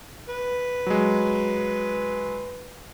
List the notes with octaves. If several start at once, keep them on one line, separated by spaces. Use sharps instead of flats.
B4
F#3 G#3